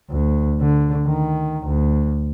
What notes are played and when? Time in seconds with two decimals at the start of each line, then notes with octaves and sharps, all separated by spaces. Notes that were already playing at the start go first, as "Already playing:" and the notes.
0.10 D2
0.61 D3
1.07 D#3
1.66 D2